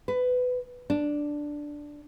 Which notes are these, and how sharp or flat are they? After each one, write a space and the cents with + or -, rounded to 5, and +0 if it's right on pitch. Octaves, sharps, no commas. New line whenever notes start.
B4 +20
D4 +0